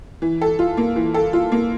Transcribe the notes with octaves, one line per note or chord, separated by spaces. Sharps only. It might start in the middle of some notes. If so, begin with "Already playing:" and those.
E3
A4
F4
A#3
E3
A4
F4
A#3